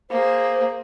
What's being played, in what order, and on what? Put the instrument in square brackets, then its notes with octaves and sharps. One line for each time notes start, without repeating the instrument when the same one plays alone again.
[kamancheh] A#3 G#4 [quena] C5